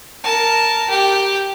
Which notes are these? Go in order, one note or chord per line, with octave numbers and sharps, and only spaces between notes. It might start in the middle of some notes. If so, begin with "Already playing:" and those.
A#4 A5
G4 G5